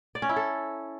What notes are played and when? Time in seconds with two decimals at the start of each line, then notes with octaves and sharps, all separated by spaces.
0.15 D5
0.22 C#4
0.29 E4
0.36 A4